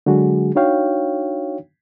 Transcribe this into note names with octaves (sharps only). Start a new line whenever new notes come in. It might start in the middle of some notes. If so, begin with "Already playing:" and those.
D3 F#3 G#3 F#4 G#4
D4 D#4 F#4 C#5 F5 G5